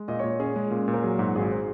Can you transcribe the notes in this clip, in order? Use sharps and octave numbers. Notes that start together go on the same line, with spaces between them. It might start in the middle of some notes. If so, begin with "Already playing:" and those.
Already playing: G#3
A#2 D#5
C#5
A#2
C#4 G#4
G#3
A#2
A#2
A#4
F#3 G#4
G#2 F#4
G#1 G#4
C5